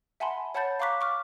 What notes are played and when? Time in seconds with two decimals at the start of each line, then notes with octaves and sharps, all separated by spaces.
0.20 E5 F#5 G#5 A5 B5 C6
0.55 C#5 F#5 A5 B5 G6 A6
0.80 F5 A#5 C#6 D6 F#6 B6
1.01 C#6 D6 F6